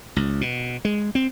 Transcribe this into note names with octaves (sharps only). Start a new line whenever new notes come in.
C#2
B2
G#3
C4